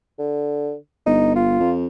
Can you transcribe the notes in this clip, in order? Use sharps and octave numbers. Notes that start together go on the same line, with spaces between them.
D3
G1 D#4
F4
F2